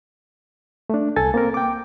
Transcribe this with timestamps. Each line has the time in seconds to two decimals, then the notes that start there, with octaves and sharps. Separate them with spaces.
0.90 A3 D4
1.16 C2 A4 G#5 A6
1.34 A#3 C4 A#4
1.54 G5 D6